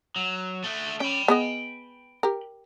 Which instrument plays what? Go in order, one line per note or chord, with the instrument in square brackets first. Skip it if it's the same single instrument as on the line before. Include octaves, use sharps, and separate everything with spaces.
[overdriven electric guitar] F#3
D3 A3
[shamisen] C#4 [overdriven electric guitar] G5 B5
[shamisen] B3 G#4 D#5
G4 A#4